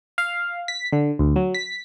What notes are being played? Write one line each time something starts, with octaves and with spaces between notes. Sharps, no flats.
F5
B6
D3
D2
F#3
B6